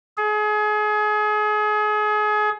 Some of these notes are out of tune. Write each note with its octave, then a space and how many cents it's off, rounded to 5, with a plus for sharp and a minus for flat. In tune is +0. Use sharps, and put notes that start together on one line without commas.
G#4 +30